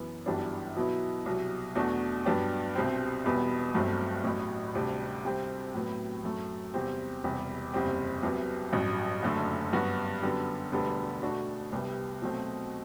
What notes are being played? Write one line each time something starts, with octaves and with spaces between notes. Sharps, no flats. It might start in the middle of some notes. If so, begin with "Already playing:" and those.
Already playing: F#2 E3 B3
G1 F#2 E3 G3 D4
B2 F#3 B3 E4
C2 B2 F#3
E2 B2 A3 D4 F#4
G2 F#3 B3 D4 G4
C2 B2 G3 C4
E1 E2 B2 G3 B3
G1 G2 F#3 A3 C4
A1 A2 F#3
D2 C3 G3 D4
C2 C3 G3 C4
A2 F#3 B3
F#2 F#3 A3
E2 C3 G3 C4
E1 E2 C3 G3
F#1 E2 C3 G3 C4
C2 C3 F#3 B3
A1 G2 F#3
F#1 F#2 D3 A3
G2 F#3 B3 F#4
F#2 D3 G3 B3
E1 D2 D3 G3 B3
B2 A3 D4 F#4
C2 C3 G3 B3
B2 F#3 A3 C4